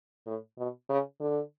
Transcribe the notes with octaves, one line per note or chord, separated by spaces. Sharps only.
A2
B2
C#3
D3